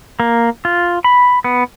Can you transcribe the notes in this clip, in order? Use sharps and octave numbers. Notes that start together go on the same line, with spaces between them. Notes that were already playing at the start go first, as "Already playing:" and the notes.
A#3
F4
B5
B3